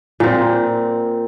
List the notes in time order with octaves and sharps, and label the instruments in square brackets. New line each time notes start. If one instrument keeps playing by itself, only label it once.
[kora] A#2 C4